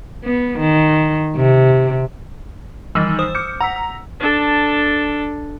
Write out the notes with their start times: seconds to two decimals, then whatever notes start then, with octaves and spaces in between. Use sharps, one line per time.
0.25 B3
0.59 D#3
1.36 C3
2.95 D#3 E3 G3 D#4 E6 A6
3.19 C5 D#6
3.35 D6 F6 G6 C#7
3.60 F#5 A#5 E6 B6
3.76 E6
4.20 D4 A4